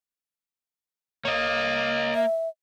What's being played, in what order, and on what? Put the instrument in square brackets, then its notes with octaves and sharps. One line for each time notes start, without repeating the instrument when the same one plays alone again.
[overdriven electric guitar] A#3 [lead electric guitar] C#5 D#5
[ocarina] E5